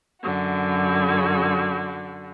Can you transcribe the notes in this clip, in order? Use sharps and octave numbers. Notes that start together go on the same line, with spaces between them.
F#2 D3 F#4